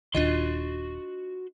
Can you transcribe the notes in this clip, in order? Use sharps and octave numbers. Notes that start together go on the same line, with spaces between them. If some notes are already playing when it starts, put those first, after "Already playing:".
D#1 D#2 D#3 D4 F4 F#4 D#5 C6